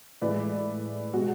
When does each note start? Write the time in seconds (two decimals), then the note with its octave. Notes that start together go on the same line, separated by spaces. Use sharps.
0.22 A2 E3 G#3 B4 D5
1.13 B2 G#3 F#4